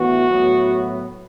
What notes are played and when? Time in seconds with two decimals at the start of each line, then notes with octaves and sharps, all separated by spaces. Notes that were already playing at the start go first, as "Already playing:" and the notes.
Already playing: A2 E3 B3 F#4
0.29 A2 F#3 B3